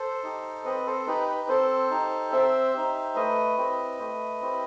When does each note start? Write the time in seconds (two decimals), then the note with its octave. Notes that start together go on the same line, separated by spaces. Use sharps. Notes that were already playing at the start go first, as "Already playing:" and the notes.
Already playing: A4 C5
0.23 D#4 G4
0.65 C4 B4 D#5
0.86 A4 C5
1.07 D#4 G4 B4
1.28 B4
1.49 C4 A4 C5
1.91 D#4 G4
2.32 C4 C5 E5
2.74 D#4 G4
3.16 A3 B4 D#5
3.57 C4 E4 G4
4.00 A3
4.41 C4 E4 G4